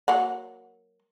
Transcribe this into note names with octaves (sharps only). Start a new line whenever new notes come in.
F#3 A#3 F#5